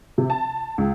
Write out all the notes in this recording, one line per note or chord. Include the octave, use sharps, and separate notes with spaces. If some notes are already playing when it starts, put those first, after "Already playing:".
C3
A5
C#2